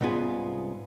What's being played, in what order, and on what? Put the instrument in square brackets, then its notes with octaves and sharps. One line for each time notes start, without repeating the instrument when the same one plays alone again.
[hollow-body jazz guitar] C2 G#2 B3 C#4 F4 G#4